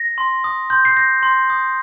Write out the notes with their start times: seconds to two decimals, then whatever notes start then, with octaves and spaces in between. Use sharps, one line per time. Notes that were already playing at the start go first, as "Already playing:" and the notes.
Already playing: A#6
0.18 C6
0.44 D#6
0.70 C6 G6
0.85 C7
0.97 G6 A#6
1.23 C6
1.50 D#6